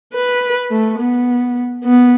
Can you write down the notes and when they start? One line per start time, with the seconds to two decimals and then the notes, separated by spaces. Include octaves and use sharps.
0.14 B4
0.71 A3
0.99 B3
1.84 B3